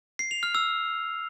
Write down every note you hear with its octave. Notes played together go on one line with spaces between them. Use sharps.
C7
F7
F6
E6